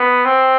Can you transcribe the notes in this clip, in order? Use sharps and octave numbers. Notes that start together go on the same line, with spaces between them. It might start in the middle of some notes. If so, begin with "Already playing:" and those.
Already playing: B3
C4